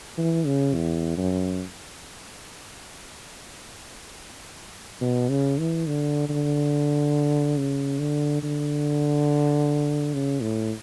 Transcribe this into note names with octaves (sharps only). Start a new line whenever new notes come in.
E3
C#3
E2
F#2
B2
C#3
E3
D3
D3
C#3
D3
D3
C#3
A2